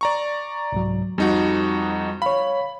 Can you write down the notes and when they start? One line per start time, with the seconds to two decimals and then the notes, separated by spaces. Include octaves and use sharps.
0.01 D5 A#5 C#6
0.72 C2 G#2 F#3
1.18 F2 G3 D#4 F#4
2.22 C#5 F5 B5